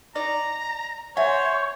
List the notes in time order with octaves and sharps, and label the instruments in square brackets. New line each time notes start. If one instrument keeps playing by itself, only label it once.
[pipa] D#4 D5 [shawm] A#5
[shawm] C5 [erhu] C#5 [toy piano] E5 F#5 [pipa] G#5